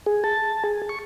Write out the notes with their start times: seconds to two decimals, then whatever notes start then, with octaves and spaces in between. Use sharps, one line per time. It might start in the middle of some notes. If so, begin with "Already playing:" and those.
0.06 G#4
0.24 A5
0.64 G#4
0.89 C#6